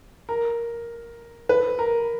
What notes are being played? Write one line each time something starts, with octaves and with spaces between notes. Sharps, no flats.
A#4
B4
A#4